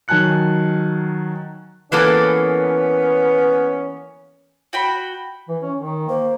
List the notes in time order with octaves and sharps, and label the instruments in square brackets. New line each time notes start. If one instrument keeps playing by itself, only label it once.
[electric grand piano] D#3 F#3 G#5 A5 F#6 C#7
[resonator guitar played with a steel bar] E3 A#3 A4 [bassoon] B3 [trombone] C#4
[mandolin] F#4 G5 B5
[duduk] E3
C#4
D#3
[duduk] A#3 [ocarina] C5